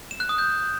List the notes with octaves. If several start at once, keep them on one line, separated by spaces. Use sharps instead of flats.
E7
F#6
D#6
G6